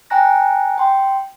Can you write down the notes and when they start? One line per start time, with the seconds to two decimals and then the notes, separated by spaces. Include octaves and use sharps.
0.10 G5 G#5 A#5 F#6 A#6
0.78 G5 C6